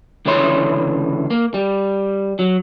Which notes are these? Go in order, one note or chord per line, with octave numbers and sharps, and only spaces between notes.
C#2 D3 E3 C#5 C6
A#3
G3
F#3